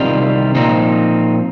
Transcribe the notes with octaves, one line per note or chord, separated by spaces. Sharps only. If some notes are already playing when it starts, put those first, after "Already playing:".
Already playing: C2 C3 D#3 G3 F4
A#2 F3 C4 D#4